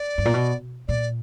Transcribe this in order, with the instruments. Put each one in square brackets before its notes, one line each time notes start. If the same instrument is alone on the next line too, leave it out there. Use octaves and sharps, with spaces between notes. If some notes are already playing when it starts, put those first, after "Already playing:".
Already playing: [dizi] D5
[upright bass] G2
A#2
B2
[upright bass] A#2 [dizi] D5